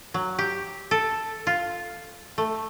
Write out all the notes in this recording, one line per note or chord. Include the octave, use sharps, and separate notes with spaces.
F#3
G4
A4
F4
A3